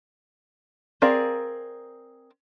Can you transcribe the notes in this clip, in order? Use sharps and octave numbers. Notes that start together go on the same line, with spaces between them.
C4 G#4 A#4 D5 F5